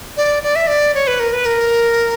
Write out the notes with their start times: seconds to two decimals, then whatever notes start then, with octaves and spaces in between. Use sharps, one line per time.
0.17 D5
0.43 D5
0.56 E5
0.67 D5
0.94 C#5
1.07 B4
1.20 A#4
1.33 B4
1.46 A#4